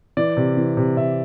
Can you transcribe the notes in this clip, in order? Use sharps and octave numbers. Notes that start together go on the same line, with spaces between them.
E3 D5
C3
E3
C3
C3 E5